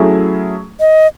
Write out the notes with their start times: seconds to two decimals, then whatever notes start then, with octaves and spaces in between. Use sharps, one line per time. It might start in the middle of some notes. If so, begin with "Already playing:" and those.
Already playing: F#3 A3 C#4 E4 G#4
0.80 D#5